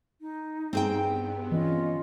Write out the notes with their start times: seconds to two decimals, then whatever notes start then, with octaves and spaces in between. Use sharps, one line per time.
0.20 D#4
0.73 G2 B3 C4 G#4 G5
1.52 E3 C#4 F4 D#5